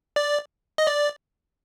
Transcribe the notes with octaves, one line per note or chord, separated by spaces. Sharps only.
D5
D#5
D5